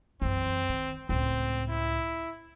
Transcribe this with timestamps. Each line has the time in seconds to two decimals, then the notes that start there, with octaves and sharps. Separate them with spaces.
0.22 F#2 E3 C4
0.69 D#3
1.09 C#2 A2 C4
1.69 E4